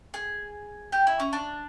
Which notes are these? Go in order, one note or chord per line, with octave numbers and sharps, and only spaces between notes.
G#4
G4
E4
C#4
D4